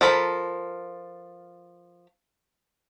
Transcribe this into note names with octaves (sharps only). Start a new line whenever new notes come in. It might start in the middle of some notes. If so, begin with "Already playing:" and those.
F3 A4 A#4 B5